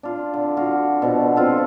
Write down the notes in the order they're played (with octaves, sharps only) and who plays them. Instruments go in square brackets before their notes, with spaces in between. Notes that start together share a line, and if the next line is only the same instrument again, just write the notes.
[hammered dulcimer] D4 F4
D3
F4 F#4
B2 D3 F3
F3 C4 F4 A4